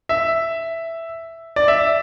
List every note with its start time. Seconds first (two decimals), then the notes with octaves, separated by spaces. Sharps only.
0.09 E5
1.56 D5
1.68 E5